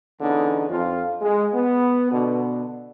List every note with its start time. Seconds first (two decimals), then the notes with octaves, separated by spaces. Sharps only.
0.20 E2 D3 B3 C#4 D#4
0.69 F2 F4
1.22 G#3
1.54 B3
2.12 B2 D3